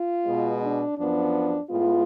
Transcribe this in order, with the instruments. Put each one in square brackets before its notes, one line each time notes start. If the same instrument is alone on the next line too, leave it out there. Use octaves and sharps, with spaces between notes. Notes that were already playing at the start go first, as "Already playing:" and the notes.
Already playing: [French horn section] F4
B2 G#3 B3
D4
F#2 F3 B3 D4
A2 G#3 B3 F4